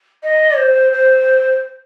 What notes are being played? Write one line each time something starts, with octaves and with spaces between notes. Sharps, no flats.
D#5
C5
C5